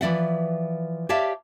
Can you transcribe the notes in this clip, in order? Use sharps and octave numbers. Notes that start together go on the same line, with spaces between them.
E3 F3 C#4 D5 E5 F#5
G4 C#5 D5 E5 F5 A5